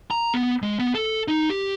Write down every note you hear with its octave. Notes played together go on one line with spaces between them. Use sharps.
A#5
B3
G#3
B3
A4
D#4
G4